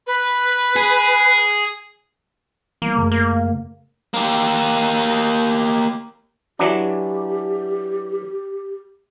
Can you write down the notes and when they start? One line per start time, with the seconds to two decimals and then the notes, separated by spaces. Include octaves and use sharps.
0.07 B4
0.76 G#4
2.82 E3 G3 A#3 B3
2.95 F#2 C#3 A3
3.12 A#3
4.14 A#3 G4
6.59 E3 F#3 D4 G4